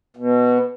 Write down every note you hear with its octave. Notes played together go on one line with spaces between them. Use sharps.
B2